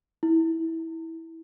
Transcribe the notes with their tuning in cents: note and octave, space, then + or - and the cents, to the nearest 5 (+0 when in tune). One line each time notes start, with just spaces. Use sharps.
E4 -20